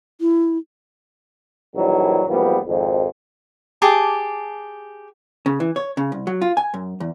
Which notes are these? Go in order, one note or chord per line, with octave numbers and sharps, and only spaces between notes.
E4
A#1 D#3 E3 F#3 G3
G#1 E2 F3 G3 A#3 B3
G#1 F2
G4 G#4 A5 D6
C#3
E3
C#5
C#3
C2
F#3
F4
G#5
F#2
E2